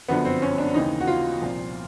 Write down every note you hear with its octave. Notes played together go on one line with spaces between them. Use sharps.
G1 F#2 D3 F3 B3
C4
C#4
D4
D#2 C#3 E3 D#4
F#4
F4
C2 A#2 F3